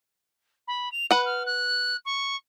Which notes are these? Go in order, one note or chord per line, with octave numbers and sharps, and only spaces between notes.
B5
F7
B4 F#5 F#6
F6
F#6
C#6